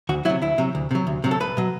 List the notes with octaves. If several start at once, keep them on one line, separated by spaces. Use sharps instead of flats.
D2 F#4
C3 F#3 E4
D2 E4
C3 F#3
D2
C3 F#3
D2
C3 F#3
A4
C2 B4
B2 F#3